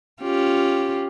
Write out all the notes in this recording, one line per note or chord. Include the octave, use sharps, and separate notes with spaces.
C#4 F4 G4